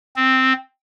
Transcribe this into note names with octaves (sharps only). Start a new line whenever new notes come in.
C4